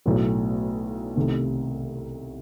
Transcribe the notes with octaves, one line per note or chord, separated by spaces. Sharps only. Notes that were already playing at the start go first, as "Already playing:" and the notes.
B1 A2 F#3
C2 C3 D#3 A3